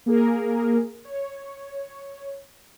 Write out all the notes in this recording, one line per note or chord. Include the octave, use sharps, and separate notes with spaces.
A#3 G#4 A#4
C#5